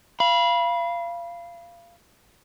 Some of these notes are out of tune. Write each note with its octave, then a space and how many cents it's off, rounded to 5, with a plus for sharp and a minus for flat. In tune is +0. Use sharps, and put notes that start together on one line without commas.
F5 -25 B5 -20